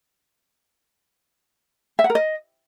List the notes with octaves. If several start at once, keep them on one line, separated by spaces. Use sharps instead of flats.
E5
F#5
A#4
D#5